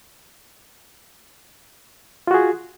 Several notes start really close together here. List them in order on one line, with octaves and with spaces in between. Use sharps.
F4 F#4 G#4